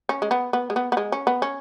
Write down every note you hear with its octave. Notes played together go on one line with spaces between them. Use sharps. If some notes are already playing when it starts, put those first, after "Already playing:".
C#4
G#3
B3
B3
G#3
B3
B3
G#3
C#4
B3
C#4